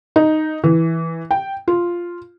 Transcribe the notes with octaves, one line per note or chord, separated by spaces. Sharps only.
D#4
E3
G5
F4